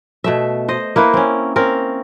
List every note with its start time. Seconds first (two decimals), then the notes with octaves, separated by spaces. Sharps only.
0.24 B2 A3 E5
0.68 C5 D#5
0.96 A#3 E4 B4 C5
1.14 C4 C#4
1.56 C4 C#4 A#4